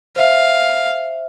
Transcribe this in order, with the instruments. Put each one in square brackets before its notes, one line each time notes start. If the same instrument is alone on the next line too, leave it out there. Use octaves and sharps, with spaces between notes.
[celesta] C5 E5 [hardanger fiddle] F5